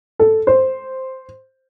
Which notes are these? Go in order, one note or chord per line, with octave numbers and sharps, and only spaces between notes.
A4
C5